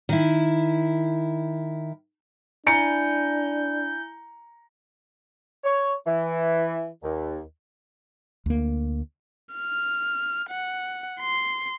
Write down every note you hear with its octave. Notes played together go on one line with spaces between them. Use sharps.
D#3 E4
D4 E4 G#5 A#5 G6 C#7
C#5
E3
D#2
D2 A#3
F6
F#5
C6